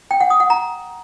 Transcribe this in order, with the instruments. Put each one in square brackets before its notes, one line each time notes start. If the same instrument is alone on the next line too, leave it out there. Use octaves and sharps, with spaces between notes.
[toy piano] G5
F#5
D#6
F#5
A#5